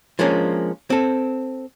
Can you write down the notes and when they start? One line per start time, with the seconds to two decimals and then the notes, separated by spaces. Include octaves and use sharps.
0.19 F3 G#3 A#3 C#4 D4
0.90 C4 A4